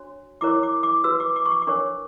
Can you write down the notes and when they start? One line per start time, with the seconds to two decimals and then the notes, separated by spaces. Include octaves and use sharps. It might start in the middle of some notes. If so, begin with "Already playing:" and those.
Already playing: D4 F#4 C#5
0.41 E4 A#4 C#5 D6
0.63 D6
0.83 D6
1.04 F#4 B4 E6
1.20 D6
1.36 D6
1.46 C#6
1.51 D6
1.62 D6
1.67 D4 A#4 C#5 C#6